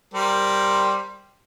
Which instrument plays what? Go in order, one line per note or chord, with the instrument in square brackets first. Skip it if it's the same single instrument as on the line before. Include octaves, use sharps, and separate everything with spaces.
[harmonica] G3 A#4 C5